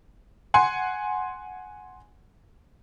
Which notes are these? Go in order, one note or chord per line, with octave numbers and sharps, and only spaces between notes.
F#5 G#5 C6